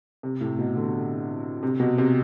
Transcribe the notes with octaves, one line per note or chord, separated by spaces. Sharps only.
C3
A2
B2
D3
C3
B2
C3